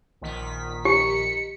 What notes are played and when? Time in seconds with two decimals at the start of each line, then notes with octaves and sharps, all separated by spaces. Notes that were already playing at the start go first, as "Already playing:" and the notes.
0.22 A#1 D#3 B6
0.85 G4 C#7